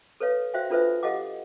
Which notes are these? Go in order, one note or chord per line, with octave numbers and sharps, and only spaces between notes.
A4 B4 C#5 F5
F#4 C5 E5 F5 G5
D4 F4 A4 B4 C5 E5
G4 A4 D#5 F5 F#5 D6